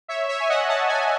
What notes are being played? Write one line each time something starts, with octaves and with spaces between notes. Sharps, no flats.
C#5 E5
C#5 E5
G#5
D#5 F#5
F#5 A5
E5 G#5